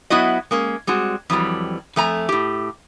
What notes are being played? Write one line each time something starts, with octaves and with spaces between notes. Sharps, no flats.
F#3 B3 E4 F#4 D#5
G#3 A#3 C#4
G3 G#3 C4 F#4
F2 E3 F#3 G3
F2 A3 G#5 A#5
A2 G4